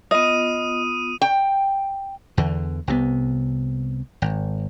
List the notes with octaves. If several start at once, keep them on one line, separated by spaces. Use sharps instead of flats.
B3 F4 D#5 D#6 D#7
G5
E2 D3
C2 C3 G3 B3
G#1